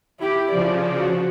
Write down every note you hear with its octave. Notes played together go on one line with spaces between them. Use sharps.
E4 G4
C#3 F3 D5
F#4